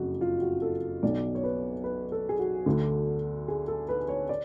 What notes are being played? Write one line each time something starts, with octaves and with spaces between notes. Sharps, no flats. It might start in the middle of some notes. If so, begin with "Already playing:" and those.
Already playing: F#1 F2 F#4
F4
F#4
A4
B1 B2 D5
C#5
B4
B4
A4
G#4
F#4
D2 D3
G#4
A4
B4
C#5
D5